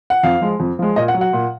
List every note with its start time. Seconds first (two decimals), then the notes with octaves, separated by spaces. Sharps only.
0.10 F#5
0.23 F2 F5
0.41 F3 G#3
0.60 F2
0.79 F3 G#3
0.96 A#2 D#5
1.08 F#5
1.14 F#3
1.21 F#5
1.33 A#2